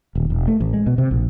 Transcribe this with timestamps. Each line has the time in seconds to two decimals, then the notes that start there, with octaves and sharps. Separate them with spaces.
0.15 D#1
0.30 E1
0.48 A3
0.61 A1
0.74 G#3
0.86 B2
0.98 C3
1.11 A#1